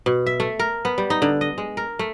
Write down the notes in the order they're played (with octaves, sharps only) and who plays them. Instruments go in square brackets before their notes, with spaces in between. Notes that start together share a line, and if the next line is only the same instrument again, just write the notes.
[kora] B2
E5
A3
A#4
B3
G3
D#4
D3
D#5
G#3
A#4
A3